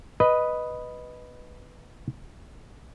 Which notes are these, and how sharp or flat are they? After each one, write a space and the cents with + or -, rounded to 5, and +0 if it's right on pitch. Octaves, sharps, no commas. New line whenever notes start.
B4 +0 D#5 +0